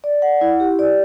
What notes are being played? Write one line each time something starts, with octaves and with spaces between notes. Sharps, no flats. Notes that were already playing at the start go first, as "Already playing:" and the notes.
D5
F#5
E4
G4
D5